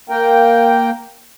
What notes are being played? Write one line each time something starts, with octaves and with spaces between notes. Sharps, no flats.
A#3 A#4 G5